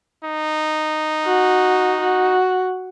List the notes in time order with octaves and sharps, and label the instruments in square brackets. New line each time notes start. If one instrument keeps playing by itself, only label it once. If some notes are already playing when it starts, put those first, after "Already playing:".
[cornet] D#4
[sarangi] F#4
F#4